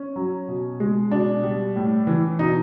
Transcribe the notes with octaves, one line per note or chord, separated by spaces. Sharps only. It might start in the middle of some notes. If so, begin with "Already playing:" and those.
Already playing: C#4
F#3
B2
G#3
B2 D4
G3
A2
E3
B2 D#4